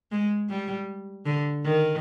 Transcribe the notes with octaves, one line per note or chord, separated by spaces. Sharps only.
G#3
G3
D3
D#3